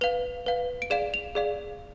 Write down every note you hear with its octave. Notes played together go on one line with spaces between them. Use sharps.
B4 F5 F7
B4 F5
D7
G#4 D5 F5 E7
F7
G#4 D5 F5